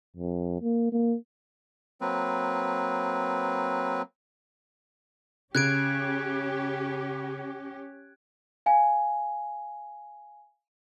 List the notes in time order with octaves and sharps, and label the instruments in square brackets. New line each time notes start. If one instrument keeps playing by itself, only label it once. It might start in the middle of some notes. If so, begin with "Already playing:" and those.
[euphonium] F2
A#3
A#3
[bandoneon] F#3 A#3 C4 B4
[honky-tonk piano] C#3 [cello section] C#4 G4 [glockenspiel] F#6 G#6 D7
[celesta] F5 G#5